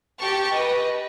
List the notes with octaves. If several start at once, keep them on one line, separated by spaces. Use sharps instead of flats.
G4 A5 C#6
B4 D#5